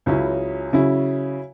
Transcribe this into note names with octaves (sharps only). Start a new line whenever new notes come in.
C#2 C#3 F#3 C#4 E4
C#3 F#3 C#4 E4